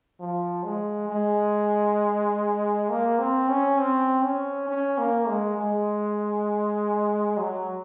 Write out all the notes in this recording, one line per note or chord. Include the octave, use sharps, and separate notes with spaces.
F3
G#3
G#3
A#3
C4
C#4
C4
C#4
C#4
A#3
G#3
G#3
F#3